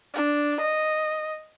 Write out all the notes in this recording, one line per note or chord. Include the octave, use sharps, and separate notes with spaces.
D4
D#5